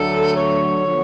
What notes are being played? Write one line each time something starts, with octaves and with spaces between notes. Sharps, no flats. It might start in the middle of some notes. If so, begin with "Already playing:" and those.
Already playing: D2 D3 F#3 A3 A4
C#5
D3 F3 B3